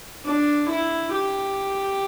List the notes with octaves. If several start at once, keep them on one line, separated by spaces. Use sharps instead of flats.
D4
E4
G4